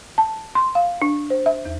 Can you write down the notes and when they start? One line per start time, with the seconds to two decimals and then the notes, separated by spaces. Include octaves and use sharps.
0.18 A5
0.55 C6
0.75 F5
1.02 D4
1.30 C5
1.46 E5
1.65 E2